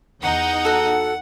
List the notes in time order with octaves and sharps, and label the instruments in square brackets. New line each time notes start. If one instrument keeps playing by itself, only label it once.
[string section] E2 D#4 G6 [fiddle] F#5
[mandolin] F#4 A4